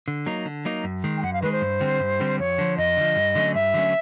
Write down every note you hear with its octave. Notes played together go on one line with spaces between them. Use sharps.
D3
F#3 A#3 D#4
D3
F#3 A#3 D#4
F#2
D#3 G#3
G5
F#2 F#5
F5
D#3 G#3 B4
C5
G2
D3 G3 C4
G2
D3 G3 C4
F2 C#5
D3 F3
F2 D#5
D3 F3
G2
D3 F#3 A3 C#4
G2 E5
D3 F#3 A3 C#4